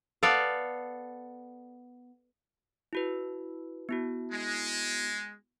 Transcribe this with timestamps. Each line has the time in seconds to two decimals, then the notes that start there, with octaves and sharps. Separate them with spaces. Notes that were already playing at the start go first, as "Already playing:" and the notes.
0.23 B3 A4 D5 F5
2.93 E4 F#4 B4
3.89 B3 E4 F#4
4.32 G#3